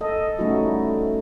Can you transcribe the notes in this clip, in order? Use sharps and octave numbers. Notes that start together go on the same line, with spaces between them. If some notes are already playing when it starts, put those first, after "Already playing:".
A4 D#5
G3 A3 C#4 D#4 E4 F#4